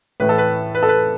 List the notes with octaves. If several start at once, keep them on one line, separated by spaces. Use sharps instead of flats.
A2 E3 A3 B4
A4
B4
B4
A4
B4